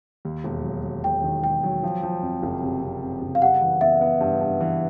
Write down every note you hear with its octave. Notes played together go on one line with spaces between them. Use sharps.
D#2
E1
F#3
F#3
E1 G5
D#3
E1 G5
F#3
F3
F3
F2
F#1
C3
C3
C3
F#1
F5
G3 F#5
E3
B3 E5
B3
G2
G2
E3